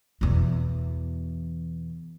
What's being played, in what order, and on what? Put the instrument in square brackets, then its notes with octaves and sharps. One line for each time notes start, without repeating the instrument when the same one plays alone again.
[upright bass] E2 B2